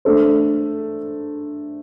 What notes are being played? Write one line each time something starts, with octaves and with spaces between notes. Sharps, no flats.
A3 D4 A4 C5